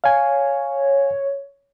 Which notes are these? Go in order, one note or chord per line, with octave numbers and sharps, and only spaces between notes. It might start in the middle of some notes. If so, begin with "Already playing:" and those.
C#5 F5 G#5